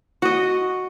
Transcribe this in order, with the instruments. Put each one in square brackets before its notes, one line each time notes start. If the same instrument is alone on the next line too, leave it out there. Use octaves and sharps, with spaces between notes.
[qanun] F#4 D#5